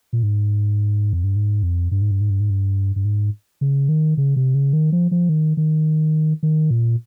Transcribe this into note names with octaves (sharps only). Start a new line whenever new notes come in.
A#2
G#2
F2
G2
G#2
F2
G2
G#2
G2
G#2
G2
G#2
G2
G2
G#2
C#3
D#3
C#3
C3
C#3
D#3
F3
F3
D#3
D#3
D#3
A#2